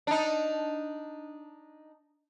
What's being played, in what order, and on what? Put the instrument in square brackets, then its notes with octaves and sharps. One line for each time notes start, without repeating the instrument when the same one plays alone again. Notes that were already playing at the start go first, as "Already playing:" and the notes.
[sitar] D4 D#4